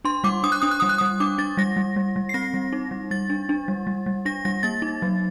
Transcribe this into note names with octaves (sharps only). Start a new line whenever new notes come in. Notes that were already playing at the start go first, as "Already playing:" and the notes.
D4 C6
G3 D6
D4 D#6
F#6
D4 D#6
F#6
G3 D#6
F#6
G3 D#6
D4 D6
D4 A6
G3 A#6
G3
G3
G3
C7
C4 A#6
G3
D#4
G3
G3 A6
D4
D4
G3
G3
G3
D4 A#6
G3 A#6
A#3 A6
D#4
F#3